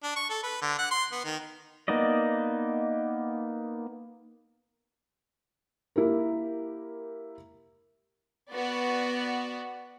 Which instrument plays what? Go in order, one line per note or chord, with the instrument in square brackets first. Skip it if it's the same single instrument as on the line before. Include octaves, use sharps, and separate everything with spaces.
[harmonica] D4
C#6
A4
B4
D3
F#5
C6
B3
D#3
[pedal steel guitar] A#3 B3 D#4 D5 D#5
[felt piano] A#3 E4 G4 A#4
[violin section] B3 F#4 D5